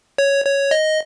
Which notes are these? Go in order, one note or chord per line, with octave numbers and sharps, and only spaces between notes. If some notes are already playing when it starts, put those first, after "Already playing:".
C#5
C#5
D#5